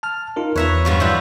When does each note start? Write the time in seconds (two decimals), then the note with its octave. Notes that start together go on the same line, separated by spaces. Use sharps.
0.03 A5 F6
0.36 D#4 F4 A#4
0.56 E2 B4 C#5 E5 A#5
0.85 G2 F3 F#4
1.00 F3 G3 E4 F#4 C5 E5